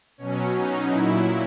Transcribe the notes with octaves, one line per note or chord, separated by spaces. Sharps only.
B2 F#3 C#4
D#4
A#2 F#3 E4